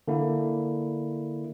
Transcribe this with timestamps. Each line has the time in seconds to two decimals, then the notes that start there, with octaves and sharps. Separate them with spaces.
0.08 D3 A#3 E4